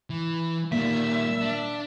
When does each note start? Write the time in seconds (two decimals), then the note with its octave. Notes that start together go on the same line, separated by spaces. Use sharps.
0.10 E3
0.72 A#2 D#3 G3 E5
1.41 D4